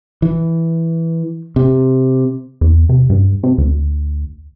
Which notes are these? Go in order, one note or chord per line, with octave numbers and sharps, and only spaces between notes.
E3
C3
E2
C3
G2
C3
D2